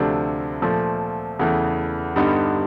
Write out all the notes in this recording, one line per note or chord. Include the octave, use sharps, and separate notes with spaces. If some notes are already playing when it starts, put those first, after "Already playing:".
Already playing: D2 C3 F3 A3 D4
A#2 F3 A3
E2 C#3 E3 A3
G2 D3 G3 B3 D#4